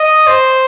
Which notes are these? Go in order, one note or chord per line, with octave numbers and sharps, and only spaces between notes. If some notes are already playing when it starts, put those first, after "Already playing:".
Already playing: D#5
C5